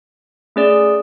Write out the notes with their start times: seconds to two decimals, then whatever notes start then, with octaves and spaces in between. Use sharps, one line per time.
0.56 A3 C#4 G#4 D5